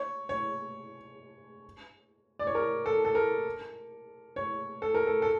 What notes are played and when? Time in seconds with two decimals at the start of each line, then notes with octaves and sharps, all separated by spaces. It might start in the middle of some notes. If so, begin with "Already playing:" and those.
Already playing: C#5
0.29 C#5
2.39 D5
2.47 C#5
2.55 A#4
2.86 A4
3.05 A4
3.15 A#4
4.36 C#5
4.82 A4
4.95 A#4
5.07 A4
5.22 A4